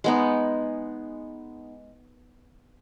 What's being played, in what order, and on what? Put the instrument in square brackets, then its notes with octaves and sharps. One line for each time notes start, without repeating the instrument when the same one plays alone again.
[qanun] G#3 B3 D#4